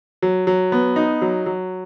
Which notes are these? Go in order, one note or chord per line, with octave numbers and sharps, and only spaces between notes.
F#3
F#3
B3
D#4
F#3
F#3